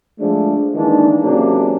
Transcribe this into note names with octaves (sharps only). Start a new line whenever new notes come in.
F3 G#3 A3 D4
D#3 E3 G#3 A#3 D4 D#4
C3 F#3 A#3 C#4 D4 G#4